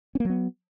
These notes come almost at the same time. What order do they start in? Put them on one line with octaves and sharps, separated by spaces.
C#4 A#3 F#3 B3